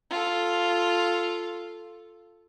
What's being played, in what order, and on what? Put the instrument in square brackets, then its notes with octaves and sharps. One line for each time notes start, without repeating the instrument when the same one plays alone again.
[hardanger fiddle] F4 A4